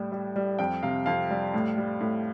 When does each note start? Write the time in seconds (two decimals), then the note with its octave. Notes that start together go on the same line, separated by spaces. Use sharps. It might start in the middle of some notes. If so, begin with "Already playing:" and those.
Already playing: A2 G3
0.12 G3
0.36 G3
0.59 F2 G5
0.83 C3 F5
1.06 F2 F5
1.31 G3
1.54 A2
1.78 G3
2.01 A2